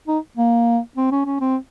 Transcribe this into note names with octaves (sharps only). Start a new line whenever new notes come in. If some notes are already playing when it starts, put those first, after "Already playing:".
D#4
A#3
C4
C#4
C#4
C4